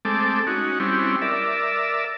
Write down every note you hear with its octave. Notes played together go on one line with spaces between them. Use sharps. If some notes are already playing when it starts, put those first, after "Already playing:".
G#3 A3 C4 A4 D6
C#4 D#4 F#4
G3 C4 C#4 E4
A#4 D5 E5